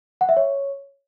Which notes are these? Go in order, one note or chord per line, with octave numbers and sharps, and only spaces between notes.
F#5
E5
C#5